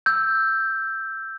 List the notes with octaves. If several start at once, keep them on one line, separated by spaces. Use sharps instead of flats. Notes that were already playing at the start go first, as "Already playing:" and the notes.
E6 G6